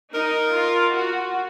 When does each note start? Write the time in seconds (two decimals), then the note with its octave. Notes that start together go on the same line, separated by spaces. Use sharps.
0.14 D#4 A#4
0.54 F4
0.94 F#4